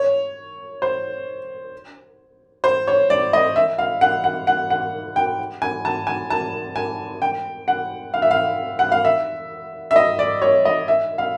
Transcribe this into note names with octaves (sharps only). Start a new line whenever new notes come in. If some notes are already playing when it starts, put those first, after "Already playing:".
Already playing: C#5
C5
C5
C#5
D5
D#5
E5
F5
F#5
F#5
F#5
F#5
G5
G#5
A5
G#5
A5
G#5
G5
F#5
F5
E5
F5
F#5
F5
E5
E5
D#5
D5
C#5
D#5
E5
F5